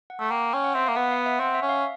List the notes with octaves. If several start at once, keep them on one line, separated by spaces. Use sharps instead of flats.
F#5
A3
A#3 G5
C#4 G5
F#5
C4 E5
A#3 F5
B3 F#5
F5
E5
C4 F#5
E5
C#4
F5